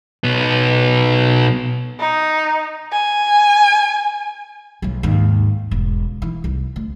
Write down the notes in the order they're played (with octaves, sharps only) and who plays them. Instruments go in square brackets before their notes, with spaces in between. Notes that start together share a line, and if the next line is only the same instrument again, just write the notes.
[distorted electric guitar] B1 B3
[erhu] D#4
G#5
[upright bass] B1 F#3
D#2 G#2
E1
E3
C2
D2